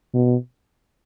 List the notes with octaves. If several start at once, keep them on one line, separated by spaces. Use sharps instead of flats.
B2